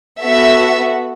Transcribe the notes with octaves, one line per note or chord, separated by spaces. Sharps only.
B3 F#4 A4 E5